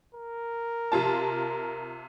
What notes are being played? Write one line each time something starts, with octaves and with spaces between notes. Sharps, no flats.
A#4
C3 F4 A5